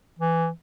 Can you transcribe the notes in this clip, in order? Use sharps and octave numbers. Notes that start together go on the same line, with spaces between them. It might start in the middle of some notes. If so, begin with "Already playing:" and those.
E3